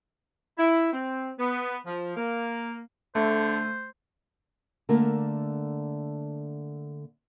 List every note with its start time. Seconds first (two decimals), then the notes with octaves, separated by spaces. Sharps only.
0.58 E4
0.93 C4
1.39 B3
1.86 F3
2.16 A#3
3.15 D3 A3 C5
4.89 D3 A3 A#3 A#4